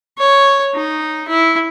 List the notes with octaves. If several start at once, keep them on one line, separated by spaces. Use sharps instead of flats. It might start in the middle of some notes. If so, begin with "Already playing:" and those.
C#5
D#4
E4